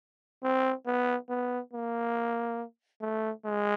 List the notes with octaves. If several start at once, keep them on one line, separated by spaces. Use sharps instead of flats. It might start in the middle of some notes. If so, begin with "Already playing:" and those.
C4
B3
B3
A#3
A3
G#3